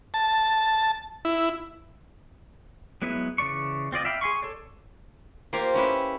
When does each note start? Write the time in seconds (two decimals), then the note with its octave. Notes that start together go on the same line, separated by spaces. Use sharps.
0.14 A5
1.25 E4
3.02 F#3 G#3 B3 E4 B4
3.38 C#3 E3 D5 C#6
3.92 C4 F4 D5 D#5
4.05 E5 F5 G5 B5
4.21 G#4 G#5 C6 C#6
4.42 A4 C#5 D5
5.53 A#3 F4 G4 C5
5.74 C#4 E4 G4 B4